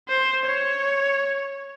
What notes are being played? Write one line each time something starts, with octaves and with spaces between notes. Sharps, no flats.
C5
C#5